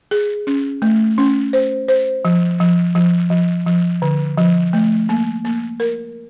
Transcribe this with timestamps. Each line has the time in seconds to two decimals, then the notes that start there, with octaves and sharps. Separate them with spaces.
0.11 G#4
0.47 C#4
0.82 A3
1.18 C#4
1.53 C5
1.88 C5
2.25 F3
2.60 F3
2.95 F3
3.30 F3
3.66 F3
4.02 D3
4.37 F3
4.73 A3
5.09 A#3
5.45 A#3
5.80 A#4